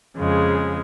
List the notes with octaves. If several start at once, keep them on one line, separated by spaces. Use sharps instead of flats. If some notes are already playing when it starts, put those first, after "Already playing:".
F2 C#3 G#3